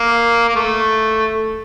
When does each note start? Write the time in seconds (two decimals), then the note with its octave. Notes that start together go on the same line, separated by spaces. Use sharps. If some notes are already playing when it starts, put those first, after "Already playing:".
Already playing: A#3
0.49 A#3
0.56 A3